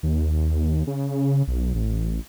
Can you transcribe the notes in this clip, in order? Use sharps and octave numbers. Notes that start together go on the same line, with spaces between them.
D#2
C#3
B1
A1